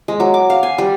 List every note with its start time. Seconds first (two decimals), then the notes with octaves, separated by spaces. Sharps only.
0.08 G#3
0.20 F#3
0.34 D6
0.50 F5
0.63 G#5
0.78 G3